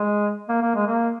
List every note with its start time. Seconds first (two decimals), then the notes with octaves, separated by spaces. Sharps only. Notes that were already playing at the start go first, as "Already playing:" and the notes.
Already playing: G#3
0.49 A#3
0.62 A#3
0.75 G#3
0.87 A#3